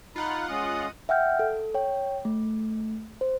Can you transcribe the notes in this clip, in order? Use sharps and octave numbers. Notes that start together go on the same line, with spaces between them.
D#4 F4 F#5 B5
G#3 C#4 D#5 D#6
E5 F#5 G5 F6 G6
A4
C#5 G5
A3
C5